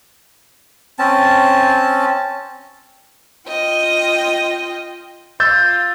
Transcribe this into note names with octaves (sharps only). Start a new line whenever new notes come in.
C4 C#4 A5
F4 D#5 G5
F4 E6 G6 A6